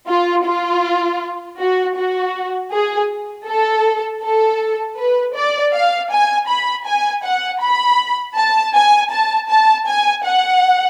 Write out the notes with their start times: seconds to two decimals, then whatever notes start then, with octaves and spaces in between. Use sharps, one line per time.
0.08 F4
0.46 F4
1.60 F#4
1.97 F#4
2.72 G#4
3.48 A4
4.23 A4
4.97 B4
5.35 D5
5.74 F5
6.11 G#5
6.49 B5
6.86 G#5
7.24 F#5
7.61 B5
8.37 A5
8.75 G#5
9.12 A5
9.50 A5
9.88 G#5
10.26 F#5